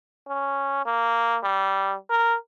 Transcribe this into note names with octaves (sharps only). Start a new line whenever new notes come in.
C#4
A#3
G3
A#4